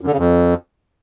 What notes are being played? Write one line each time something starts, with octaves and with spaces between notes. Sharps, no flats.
F#2
D3
C#3
F2